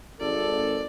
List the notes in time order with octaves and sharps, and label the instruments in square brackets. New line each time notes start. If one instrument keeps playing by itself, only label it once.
[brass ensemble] G#1 A4 [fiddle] D5